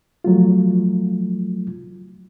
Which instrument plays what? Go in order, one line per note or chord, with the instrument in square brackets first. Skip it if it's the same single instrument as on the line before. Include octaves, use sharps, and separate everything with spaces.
[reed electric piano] F3 F#3 A3 F4